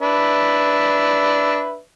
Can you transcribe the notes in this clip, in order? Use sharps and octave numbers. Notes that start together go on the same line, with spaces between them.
D4 B4 E5